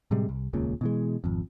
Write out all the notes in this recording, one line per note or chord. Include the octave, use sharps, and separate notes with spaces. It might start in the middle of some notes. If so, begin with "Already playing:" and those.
A2 C3 G3 G#3
C2
D#1 C#2 A#2 C#3
B2 E3 G#3
G#1 F2